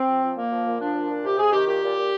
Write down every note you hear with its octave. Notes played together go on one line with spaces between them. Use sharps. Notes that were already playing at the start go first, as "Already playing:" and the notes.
Already playing: C4
F3
F3
A#2 A#3
F3
A#2
F3 D4
A#2
A#2
C3 G4
C3 G#4
D#3 G4
A#2 G4
A#2
A#2